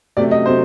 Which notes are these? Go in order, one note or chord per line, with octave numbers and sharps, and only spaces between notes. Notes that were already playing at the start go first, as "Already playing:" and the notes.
C3 F#3 A3 D5
D#5
C3 F#3 A3 C5